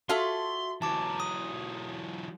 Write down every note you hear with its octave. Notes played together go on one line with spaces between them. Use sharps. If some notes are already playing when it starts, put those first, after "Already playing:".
F4 F#4 A4 E5 C6
E3 F#3 A5 D6
D#6